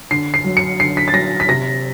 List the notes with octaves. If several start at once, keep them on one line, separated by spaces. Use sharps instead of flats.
D3 C7
C7
F#3
C#7
D3 C7
B6
A6
F#3 A#6
B6
C3 A#6